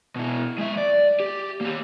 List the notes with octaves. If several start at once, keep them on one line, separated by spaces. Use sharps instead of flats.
B2 E4
G#3 E5
D5
G4
A#3 G4